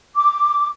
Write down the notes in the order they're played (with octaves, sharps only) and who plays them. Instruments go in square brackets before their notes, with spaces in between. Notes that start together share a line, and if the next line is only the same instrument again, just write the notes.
[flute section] D6